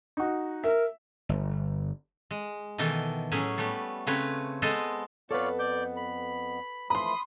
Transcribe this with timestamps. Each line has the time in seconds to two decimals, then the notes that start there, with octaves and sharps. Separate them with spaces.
0.17 D#4 F#4
0.64 A#4 E5
1.29 G1
2.31 G#3
2.78 B2 D#3 E3 A4 G5
3.32 A2 F#3 C#4 G#4 E5
3.58 G3 A3 B3
4.07 C#3 A3 C4 B4 C#5
4.62 G#3 B3 A4 C5 D#5
5.31 F2 B3 F4 A4 B4 C#5 D5
5.59 D5 D6 G6
5.97 B5
6.90 E3 F3 A3 B5 C6 D#6